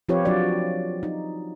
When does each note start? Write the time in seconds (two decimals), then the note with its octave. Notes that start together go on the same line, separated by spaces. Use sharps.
0.09 F3 C4 F4 G4 B4 C#5
0.25 F#3 D4 F4 F#4 D5
1.03 D#4